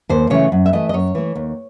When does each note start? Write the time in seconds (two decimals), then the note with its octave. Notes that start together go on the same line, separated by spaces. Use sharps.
0.09 D#2 C5
0.30 C#3 E3 A3 C#5
0.52 F#2
0.66 E5
0.73 E3 A3 D#5
0.89 D#5
0.93 F#2 C#5
1.15 E3 A3
1.35 D#2